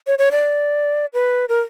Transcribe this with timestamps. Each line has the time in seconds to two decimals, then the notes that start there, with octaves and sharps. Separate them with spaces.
0.07 C#5
0.19 C#5
0.31 D5
1.14 B4
1.49 A#4